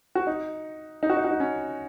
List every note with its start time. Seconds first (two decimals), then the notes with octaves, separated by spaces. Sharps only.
0.15 F#4
0.27 D#4
1.03 D#4
1.10 F#4
1.17 D#4
1.24 F#4
1.31 D#4
1.40 C#4